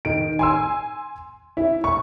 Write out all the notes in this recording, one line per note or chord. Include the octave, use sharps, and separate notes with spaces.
D#3 D7
G#5 C6 E6
E4
C#6